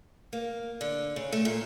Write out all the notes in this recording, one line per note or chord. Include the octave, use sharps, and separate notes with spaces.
A#3
D3
C#3
A3
A#2